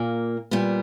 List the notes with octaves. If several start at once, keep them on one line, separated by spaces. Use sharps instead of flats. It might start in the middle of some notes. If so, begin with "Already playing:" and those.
Already playing: A#2 A#3
A#2 G3 B3